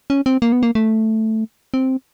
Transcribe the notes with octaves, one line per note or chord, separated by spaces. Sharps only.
C#4
C4
A#3
B3
A#3
A3
C4